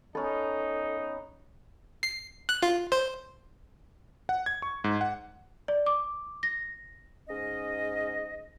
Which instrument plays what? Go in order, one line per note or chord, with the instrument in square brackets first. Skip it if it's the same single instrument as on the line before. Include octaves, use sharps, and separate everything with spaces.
[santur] B3 C#4 [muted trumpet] D#4 [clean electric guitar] A4
[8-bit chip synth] C7
F#6
F4
C5
[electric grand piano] F#5
G#6
C#6
G#2
F#5
[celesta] D5
D6
A#6
[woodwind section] G#2 C#4 D#5